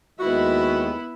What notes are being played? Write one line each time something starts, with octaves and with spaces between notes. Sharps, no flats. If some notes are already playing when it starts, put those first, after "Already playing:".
D#2 D#3 G#3 B3 E4 F#4